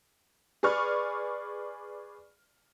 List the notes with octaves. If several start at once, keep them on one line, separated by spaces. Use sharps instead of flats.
G#4 B4 D5 C#6 F6